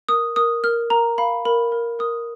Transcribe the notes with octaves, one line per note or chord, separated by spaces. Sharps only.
A#4 D#6
A#4 D#6
A#4 F6
A#4 A#5
F5 B5
A#4 B5
A#4
A#4 D#6